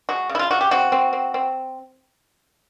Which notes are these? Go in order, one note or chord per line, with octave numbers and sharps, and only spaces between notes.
G#3 F#4
C#3
E4
F4
C#3 F#4
G4
C4 F#4
C4
C4
C4